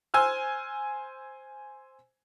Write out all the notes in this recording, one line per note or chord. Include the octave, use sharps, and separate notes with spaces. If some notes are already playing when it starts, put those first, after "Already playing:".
C5 G#5 E6 F6